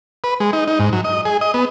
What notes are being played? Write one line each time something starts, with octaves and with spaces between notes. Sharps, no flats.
B4
G#3
D#4
D#4
G#2
F#3
D#5
G#4
D#5
B3